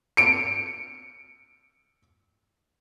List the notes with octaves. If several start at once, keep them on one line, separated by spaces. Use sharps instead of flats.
C#7 D7